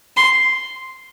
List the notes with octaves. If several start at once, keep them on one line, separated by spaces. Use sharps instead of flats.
C6